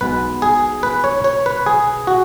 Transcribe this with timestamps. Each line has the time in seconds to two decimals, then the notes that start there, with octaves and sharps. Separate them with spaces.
0.01 B1 B2 G#3 B4
0.42 G#4
0.83 B4
1.04 C#5
1.24 C#5
1.46 B4
1.66 G#4
2.07 F#4